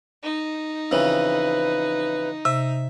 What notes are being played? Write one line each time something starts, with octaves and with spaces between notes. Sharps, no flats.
D#4
F2 C#3 E3 B4
C3 E5